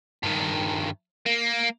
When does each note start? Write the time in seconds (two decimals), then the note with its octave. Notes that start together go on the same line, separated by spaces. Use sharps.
0.23 G2 D#3
1.26 A#3